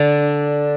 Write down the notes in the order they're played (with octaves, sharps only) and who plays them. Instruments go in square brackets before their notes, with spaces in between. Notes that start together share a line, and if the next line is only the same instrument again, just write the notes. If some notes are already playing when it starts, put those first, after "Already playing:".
Already playing: [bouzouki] D3 [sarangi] D4